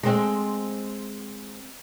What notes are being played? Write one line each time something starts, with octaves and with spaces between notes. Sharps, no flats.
G#3 C4